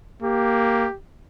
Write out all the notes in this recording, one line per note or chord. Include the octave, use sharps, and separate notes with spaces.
A#3 G4